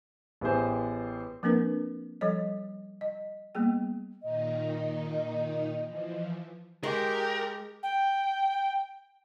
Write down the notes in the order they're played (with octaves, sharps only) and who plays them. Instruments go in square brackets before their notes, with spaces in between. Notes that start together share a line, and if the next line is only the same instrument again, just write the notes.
[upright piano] A1 B3 G4 G#4 C5
[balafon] F3 A#3 C4 D4 A#4 B4
F3 G3 A4 C#5 D#5
D#5
G3 A#3 B3 G#4 G5
[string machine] A#2 D#3 D#4 [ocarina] D#5
[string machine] E3 F3
[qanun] G#3 [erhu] G4 [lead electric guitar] A#4
[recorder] G5